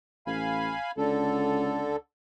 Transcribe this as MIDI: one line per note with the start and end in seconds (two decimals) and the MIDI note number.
0.27 0.73 33
0.27 0.91 77
0.27 0.91 80
0.27 0.91 83
0.97 1.95 37
0.97 1.96 50
0.97 1.96 69